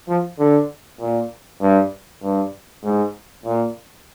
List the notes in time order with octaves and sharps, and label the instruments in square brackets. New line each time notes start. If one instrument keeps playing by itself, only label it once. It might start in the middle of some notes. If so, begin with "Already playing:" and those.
[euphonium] F3
D3
A#2
G2
G2
G#2
A#2